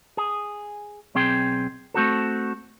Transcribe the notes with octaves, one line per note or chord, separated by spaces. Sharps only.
G#4
B1 C4 G#4 G5
A3 C4 F#4 A4